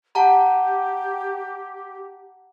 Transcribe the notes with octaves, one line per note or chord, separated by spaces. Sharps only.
G4 F#5 A5 A#5